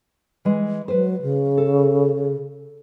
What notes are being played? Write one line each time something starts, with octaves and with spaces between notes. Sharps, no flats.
E3 G#3
F#3 B4 C5
C#3
A4